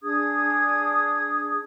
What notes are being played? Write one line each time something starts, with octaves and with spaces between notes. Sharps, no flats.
D4 G#4 D#6 G#6